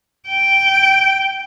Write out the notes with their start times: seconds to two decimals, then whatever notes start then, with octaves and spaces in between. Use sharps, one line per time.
0.29 G5